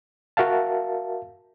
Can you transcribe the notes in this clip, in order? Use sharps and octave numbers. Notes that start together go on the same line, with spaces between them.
F#4 A#4 E5 F5 A5